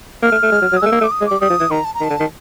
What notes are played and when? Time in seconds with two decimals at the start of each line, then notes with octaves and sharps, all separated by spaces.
0.22 A#3 F6
0.32 A3
0.43 A3
0.52 G#3
0.61 F#3
0.72 F#3
0.77 D#6
0.82 G#3 E6
0.86 A3
0.92 A#3
1.01 A3
1.03 D6
1.12 D#6
1.21 G#3
1.26 G3 D6
1.41 G3 D#6
1.50 F3
1.60 E3
1.70 D#3 A#5
1.85 A5
1.94 A#5
2.00 D#3
2.04 A5
2.10 D3
2.20 D#3